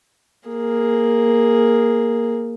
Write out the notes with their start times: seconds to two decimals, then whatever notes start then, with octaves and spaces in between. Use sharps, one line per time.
0.49 A#3 G#4